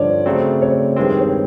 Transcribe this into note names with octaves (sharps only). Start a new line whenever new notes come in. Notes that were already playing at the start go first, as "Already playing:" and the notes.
Already playing: G2 D3 F3 C#5 D5
C#3 F#3 A3 C4
C#5
G2 D#3 G#3 C4
C5
C#5